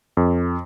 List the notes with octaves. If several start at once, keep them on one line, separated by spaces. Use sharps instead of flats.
F2